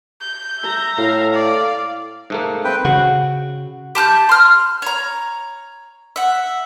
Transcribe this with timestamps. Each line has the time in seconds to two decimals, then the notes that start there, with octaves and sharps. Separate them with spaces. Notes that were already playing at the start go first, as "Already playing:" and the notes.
0.21 G6
0.60 E5 A#5
0.98 A2 F5
1.33 D5 F5
2.30 G#2 A3 A#3
2.64 C4 B4 G5
2.85 C#3 F#4
3.95 G4 A5 F#6 G6
4.29 C6 F6
4.82 C#5 A#5
6.16 E5 F#5